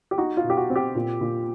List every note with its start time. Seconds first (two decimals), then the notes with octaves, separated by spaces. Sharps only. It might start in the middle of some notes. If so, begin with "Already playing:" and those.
0.11 G4
0.18 D#4 F#4
0.37 F4
0.44 B2
0.50 G4
0.57 F#4
0.70 C4
0.76 G4
0.96 A#2
1.21 A#2